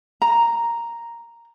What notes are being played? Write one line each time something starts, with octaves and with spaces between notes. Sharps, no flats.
A#5